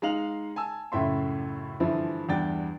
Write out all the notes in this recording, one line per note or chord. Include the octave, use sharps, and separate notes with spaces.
G#3 D#4 F5 F7 F#7
G#5 A5 E6
C#2 F#2 A2 E5 C6
G2 D3 E3 F3 E4
E2 G2 G3 D4 G5 A6